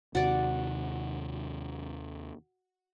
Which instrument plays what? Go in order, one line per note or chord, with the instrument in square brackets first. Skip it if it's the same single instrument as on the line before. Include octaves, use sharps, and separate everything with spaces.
[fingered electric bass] D#2 C3 D#3 [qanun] F#4 D5